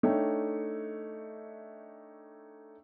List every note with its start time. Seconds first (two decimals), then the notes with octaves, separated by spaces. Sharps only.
0.03 A3 D4 D#4 C#5 E5 G5